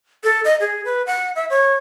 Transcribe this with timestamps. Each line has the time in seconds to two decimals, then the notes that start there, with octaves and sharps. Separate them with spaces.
0.24 A4
0.45 D#5
0.60 G#4
0.85 B4
1.07 F#5
1.36 E5
1.50 C#5